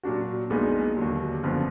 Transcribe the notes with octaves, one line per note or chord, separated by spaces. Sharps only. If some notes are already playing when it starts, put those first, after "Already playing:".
A#2 F#3 D4 F#4
A#1 A#2 G#3 B3 D#4
D#2 D3 F#3
F#1 F2 D3 F3 B3